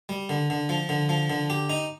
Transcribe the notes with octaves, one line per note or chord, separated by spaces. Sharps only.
G3
D3
D3
F3
D3
F3
D3
G4
D#4